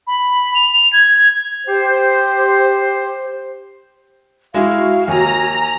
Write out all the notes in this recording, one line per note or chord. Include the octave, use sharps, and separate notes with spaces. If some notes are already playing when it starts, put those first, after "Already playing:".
B5
F7
F7
G#6
G4 C5
G#3 E4 F#4 F5
D#2 G#5 A#5